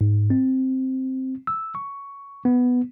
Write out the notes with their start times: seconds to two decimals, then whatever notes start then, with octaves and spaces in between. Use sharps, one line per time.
0.01 G#2
0.30 C4
1.47 E6
1.75 C#6
2.45 B3